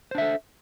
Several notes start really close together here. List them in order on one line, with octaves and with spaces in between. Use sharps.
C5 D4 E5 A4